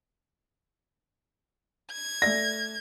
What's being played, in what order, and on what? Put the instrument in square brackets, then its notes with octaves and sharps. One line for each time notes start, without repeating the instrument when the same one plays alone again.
[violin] G#6
[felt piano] A3 D5 [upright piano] A#6